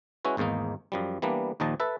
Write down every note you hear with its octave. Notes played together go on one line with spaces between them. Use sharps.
G#3 C#4 E4 F#4 B4
G#1 E2 G#2 A#3 D#4
F#2 F3 G3
E3 G3 A#3 B3 D4
D#2 A#2 D#3 F3 D#5 A5
A4 B4 E5